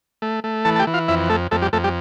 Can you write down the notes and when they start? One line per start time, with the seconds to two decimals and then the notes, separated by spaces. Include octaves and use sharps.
0.22 A3
0.44 A3
0.65 E3 A4 A5
0.76 A5
0.79 G4 G5
0.87 E3
0.94 F4 F5
1.08 F2 E4 E5
1.29 A3 A4
1.51 F2 A3 A4
1.62 G3 G4
1.73 F2 A3 A4
1.84 G3 G4